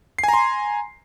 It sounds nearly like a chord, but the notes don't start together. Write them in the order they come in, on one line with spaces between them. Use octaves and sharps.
C7 G#5 A#5 C6